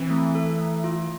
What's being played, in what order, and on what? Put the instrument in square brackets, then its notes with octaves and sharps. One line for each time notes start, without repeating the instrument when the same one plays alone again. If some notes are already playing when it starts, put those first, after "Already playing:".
Already playing: [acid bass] E3 [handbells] C4
[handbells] A3
A4
A3
F4